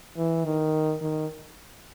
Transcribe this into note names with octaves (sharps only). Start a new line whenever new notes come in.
E3
D#3
D#3